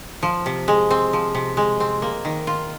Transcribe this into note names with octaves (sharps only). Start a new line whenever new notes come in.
F3
C3
G#3
C4
F3
C3
G#3
C4
A#3
D#3
F4